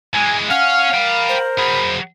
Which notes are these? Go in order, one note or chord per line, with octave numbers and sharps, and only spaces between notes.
E3 G#3 G#5
C#4 F5 F#5 F6
A#4 G5 B5
C5
F#3 G#4 B5